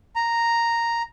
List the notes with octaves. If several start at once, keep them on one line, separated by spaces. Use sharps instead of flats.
A#5